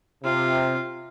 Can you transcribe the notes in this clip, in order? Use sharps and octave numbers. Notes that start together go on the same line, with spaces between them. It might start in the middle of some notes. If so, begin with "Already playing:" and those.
C3 F4